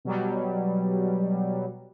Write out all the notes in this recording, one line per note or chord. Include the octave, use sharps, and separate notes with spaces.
B2 F#3 G3